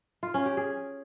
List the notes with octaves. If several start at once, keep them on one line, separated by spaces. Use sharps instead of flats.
F4
C#4
G4
G#4